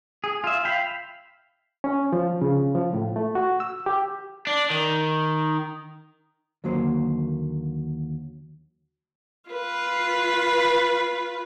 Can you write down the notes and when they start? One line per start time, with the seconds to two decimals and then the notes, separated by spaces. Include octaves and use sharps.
0.24 G#4
0.44 F4 E5
0.65 E5 F5 G5 B5
1.84 C#4
2.13 F3
2.42 C#3
2.75 F3
2.93 A2
3.16 A3
3.35 F#4
3.60 E6
3.86 G4
4.47 D4
4.70 D#3
6.64 D#2 D3 F#3 A#3 C5
9.50 F4 B4